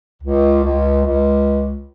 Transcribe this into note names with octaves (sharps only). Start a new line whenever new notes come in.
C#2
C#2
C#2